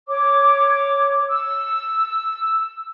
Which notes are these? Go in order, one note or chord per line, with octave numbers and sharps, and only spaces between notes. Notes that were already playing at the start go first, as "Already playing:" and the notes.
C#5 D6
E6